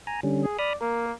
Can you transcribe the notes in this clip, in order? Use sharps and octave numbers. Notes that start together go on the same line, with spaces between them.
G#5 A#5
D3 G3 C#4
G#4
D5 B5 D#6 F6
A#3 A#4